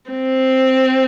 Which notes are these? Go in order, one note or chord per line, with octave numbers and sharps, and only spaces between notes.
C4